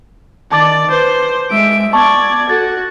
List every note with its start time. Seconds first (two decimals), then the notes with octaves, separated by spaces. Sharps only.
0.52 D#3 D5 A5 D6 A6
0.91 B4 C5
1.51 G#3 E5 D7
1.93 B3 D5 A5 C#6 G#6
2.49 F#4 A4 A6